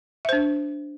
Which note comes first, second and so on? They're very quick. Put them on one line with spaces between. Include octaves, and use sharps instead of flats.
E5 C5 D4